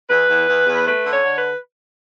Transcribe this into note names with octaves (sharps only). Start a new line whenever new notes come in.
E2 B4
E2
E2
E2
A3 B4
D3
C#5
D3
B4